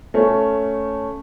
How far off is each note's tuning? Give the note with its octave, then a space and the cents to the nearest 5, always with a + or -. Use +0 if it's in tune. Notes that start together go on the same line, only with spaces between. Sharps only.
A3 +0 C#4 +5